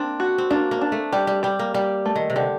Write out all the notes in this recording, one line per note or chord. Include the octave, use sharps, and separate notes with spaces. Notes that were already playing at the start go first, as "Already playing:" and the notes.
Already playing: A#3 C4 D4
F#4
C4
A#3 D4
A#3
D4
A3
G3 G4
G3
G3 G4
A#3
G3 G4
A3
D#3
C3
D3 G4